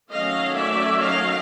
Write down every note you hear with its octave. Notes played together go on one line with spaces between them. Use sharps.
D#3 F#3 A3 C#4 D#5 F5
D5 E5
D#5 F5